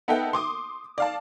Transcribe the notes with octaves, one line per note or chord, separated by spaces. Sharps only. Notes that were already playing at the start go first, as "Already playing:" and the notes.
B3 D#4 A4 E5 F#5 G5
C6 D6 D#6
D5 F5 A5